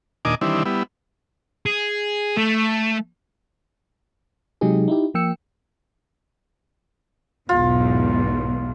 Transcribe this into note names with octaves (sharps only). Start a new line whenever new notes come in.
D#2 A#2 D4 D#5 G#5 D6
D#3 E3 G3 C4 D4 E4
G3 B3 E4
G#4
A3
C3 F#3 G#3 D#4 G4 G#4
D#4 E4 G4
F3 A#3 G5 E6 C#7
B1 E2 G#2 F4